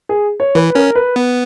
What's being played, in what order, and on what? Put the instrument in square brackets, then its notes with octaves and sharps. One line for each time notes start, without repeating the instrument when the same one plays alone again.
[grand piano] G#4
C#5
[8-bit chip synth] E3 [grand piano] B4
[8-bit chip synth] C#4 [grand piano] A#4
[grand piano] B4
[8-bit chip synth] B3